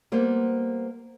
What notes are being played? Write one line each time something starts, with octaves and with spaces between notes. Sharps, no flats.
G3 A#3 B3 C5